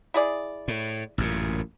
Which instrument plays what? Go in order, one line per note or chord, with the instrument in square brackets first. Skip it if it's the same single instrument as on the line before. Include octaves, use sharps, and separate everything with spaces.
[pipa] E4 G#4 D5
[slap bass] A2
A1 F#2 A#2